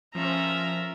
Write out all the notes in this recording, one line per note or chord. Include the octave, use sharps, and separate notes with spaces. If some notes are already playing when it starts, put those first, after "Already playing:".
F3 C#4 F4 A#4 E5 A#5